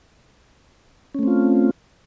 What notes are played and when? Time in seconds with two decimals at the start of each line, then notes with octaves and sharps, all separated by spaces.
1.14 C#4
1.19 A3
1.23 C4
1.27 F4